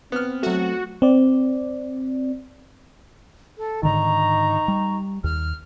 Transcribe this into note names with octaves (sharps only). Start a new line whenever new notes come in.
B3 C4 F6
F#3 A3 F#4
C4 D5
A4
G#2 D3 D#3 D#4 A#5 C#6
G3
D#2 F6